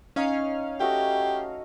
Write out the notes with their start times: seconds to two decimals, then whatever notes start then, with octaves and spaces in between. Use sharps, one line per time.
0.16 C#4 D#4 F5
0.80 A3 F#4 G4 D#5